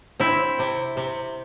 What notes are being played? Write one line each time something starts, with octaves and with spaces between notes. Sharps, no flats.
C4 E4
C3
C3